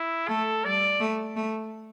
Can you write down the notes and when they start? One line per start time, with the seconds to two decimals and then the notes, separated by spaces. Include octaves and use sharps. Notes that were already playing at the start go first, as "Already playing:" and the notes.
Already playing: E4
0.28 A3 A4
0.64 G3 D5
1.00 A3
1.36 A3